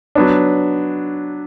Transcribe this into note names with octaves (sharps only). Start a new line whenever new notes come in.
F#3 B3 D4